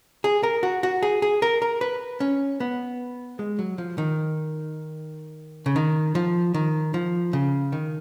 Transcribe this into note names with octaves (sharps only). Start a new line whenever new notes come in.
G#4
A#4
F#4
F#4
G#4
G#4
A#4
A#4
B4
C#4
B3
G#3
F#3
F3
D#3
C#3
D#3
F3
D#3
F3
C#3
D#3